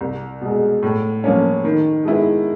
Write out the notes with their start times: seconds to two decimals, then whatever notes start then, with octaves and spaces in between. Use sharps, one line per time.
0.01 C2
0.41 B2 G#3
0.83 A2
1.24 F3 A#3 C#4
1.64 D#3
2.05 G#3 B3 E4